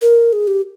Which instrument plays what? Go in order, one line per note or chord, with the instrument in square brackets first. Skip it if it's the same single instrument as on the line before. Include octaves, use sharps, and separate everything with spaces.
[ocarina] A#4
G#4
G4